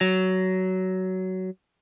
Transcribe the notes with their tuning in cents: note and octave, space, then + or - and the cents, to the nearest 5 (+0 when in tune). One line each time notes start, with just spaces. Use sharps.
F#3 +15